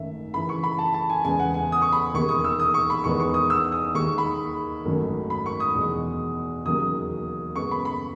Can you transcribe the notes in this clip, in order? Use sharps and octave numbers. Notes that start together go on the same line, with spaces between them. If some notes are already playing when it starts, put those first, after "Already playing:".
Already playing: G#1 F#2 D#3 A3 E5
F#2 C#3 E3 B5
C#6
B5
A5
A5
G#5
E2 C#3 G#3 B3 G#5
F#5
G#5
D#6
C#6
B5
E1 D#2 D#3 C#6
D#6
E6
D#6
C#6
B5
E2 D#3 G#3 B3 C#6
C#6
D#6
E6
D#6
D#2 D#3 G#3 C#6
B5
G#1 F#2 D#3 F#3 A3
B5
C#6
D#6
E2 B2 G#3
E1 D#2 C#3 F#3 D#6
F#2 C#3 G#3 B3 C#6
B5
B5